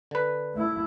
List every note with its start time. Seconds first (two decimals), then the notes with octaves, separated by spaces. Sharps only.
0.11 D3 B4
0.54 A3 E4